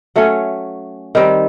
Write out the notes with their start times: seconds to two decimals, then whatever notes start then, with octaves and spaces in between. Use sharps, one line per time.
0.16 F#3 A3 C#4
1.15 D#3 G3 C4